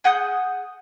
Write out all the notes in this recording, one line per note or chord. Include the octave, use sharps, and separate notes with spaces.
G#4 F#5 D#6 G6